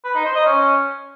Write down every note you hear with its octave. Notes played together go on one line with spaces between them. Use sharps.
B4
D#4
C5
D#5
C#4